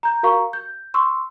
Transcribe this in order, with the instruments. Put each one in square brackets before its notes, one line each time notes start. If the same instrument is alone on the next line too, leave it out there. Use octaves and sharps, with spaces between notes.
[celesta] A#5 G6
F#4 A#4 F5 A#5 C#6
G6
C6 C#6 E6